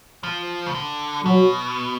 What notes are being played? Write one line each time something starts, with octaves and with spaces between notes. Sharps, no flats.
F3
C#3
D3
B2 F#3